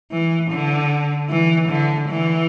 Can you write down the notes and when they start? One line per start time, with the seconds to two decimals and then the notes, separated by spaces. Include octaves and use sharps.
0.12 E3
0.51 D3
1.30 E3
1.69 D3
2.09 E3